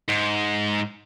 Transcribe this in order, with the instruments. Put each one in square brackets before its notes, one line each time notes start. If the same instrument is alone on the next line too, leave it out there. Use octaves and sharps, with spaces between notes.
[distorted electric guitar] G#2